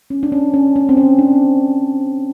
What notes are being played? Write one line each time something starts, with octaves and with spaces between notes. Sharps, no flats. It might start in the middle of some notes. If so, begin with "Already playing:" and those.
C#4
D4
C#4
C#4
C#4
C4
C#4
D4